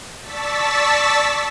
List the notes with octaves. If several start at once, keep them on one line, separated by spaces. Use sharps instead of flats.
D5 A5 C#6 E6 A6 B6